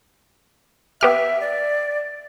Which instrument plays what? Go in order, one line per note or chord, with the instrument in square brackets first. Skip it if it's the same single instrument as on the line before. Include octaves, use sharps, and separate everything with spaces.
[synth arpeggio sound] B3 G4 F6 [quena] E5
[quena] D5